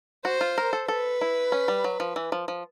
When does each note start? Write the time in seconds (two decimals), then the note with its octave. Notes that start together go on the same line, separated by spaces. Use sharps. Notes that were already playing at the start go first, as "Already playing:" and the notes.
0.25 F#4 C5
0.41 F4
0.58 A#4
0.73 A4
0.88 A4 B4
1.21 E4
1.52 C#4
1.68 G3
1.84 F#3
2.00 F3
2.16 E3
2.32 F3
2.48 F3